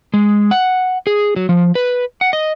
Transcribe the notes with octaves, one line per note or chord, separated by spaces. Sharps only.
G#3
F#5
G#4
F#3
F3
B4
F#5
D#5